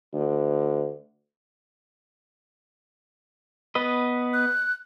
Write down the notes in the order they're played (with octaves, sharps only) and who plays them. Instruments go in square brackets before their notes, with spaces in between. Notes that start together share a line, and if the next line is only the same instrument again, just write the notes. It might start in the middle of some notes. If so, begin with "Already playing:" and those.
[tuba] D2
[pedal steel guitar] B3 B4 D#5
[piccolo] F#6